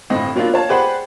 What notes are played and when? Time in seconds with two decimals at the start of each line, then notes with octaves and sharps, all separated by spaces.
0.10 G1 A2 C4 D#5
0.36 F#3 A#3 B3 D4 F4
0.54 C#5 F5 A5
0.69 G4 G#4 B4 C5 D5 F#5